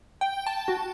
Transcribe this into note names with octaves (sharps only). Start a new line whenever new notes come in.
G5
A5
F#4